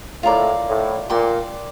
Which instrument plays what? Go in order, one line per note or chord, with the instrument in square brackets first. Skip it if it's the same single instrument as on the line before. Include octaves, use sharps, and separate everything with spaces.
[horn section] A2 [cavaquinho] F4 A#4 D5
[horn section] A2
[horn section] A#2 [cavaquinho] D5 G5 C6